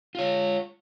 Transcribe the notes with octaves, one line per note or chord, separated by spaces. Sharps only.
F4 C#5